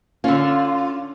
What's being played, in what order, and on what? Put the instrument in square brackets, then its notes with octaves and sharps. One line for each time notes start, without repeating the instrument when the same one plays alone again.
[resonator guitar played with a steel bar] D3 F4 [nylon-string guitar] C#4